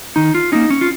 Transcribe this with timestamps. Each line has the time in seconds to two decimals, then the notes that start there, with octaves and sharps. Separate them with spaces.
0.16 D#3 D#4
0.35 F4
0.52 A#3 C#4 D#4
0.70 C#4
0.81 F4